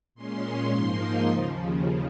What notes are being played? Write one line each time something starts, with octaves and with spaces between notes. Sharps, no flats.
A#2 G#3 C#4 C6
G#2 F3 A#3 D#4
D#2 C#3 F3